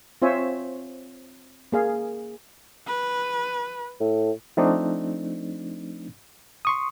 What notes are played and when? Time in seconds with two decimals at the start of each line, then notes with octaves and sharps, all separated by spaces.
0.22 C4 F4 C5 C#5 E5 G#5
1.72 A#3 G#4 F5
2.87 B4
4.01 A2
4.57 F3 A3 C4 D4 D#4
6.65 C6 C#6 D#6